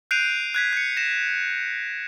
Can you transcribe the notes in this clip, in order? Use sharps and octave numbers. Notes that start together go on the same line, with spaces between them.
F#6 G6 C7 D7 D#7 F7
F#6 G#6 B6
G6 C#7
A#6 E7